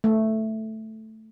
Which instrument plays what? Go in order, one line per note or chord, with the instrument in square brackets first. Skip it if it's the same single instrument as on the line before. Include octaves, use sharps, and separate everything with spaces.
[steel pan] A3